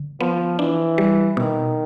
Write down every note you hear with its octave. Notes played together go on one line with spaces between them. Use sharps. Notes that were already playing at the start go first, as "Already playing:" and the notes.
Already playing: D3
F3 B3
E3 D4
G3
B2 D#3